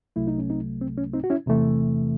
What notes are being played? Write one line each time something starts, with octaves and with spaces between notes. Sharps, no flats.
C2 C3 F#3 A3 E4
D#4
C#4
C4 D#4
C4
C#4
C4 D#4
F#4
C#4 E4
E2 C3 E3 A3